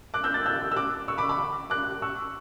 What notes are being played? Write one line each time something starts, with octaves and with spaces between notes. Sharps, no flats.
D6 F#6
E6 G6
F#6 A6
E6 G6
E6
D6 F#6
C#6 E6
B5 D6
B5 D6
D6 F#6
C#6 E6